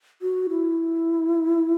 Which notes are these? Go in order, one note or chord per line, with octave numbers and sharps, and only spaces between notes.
F#4
E4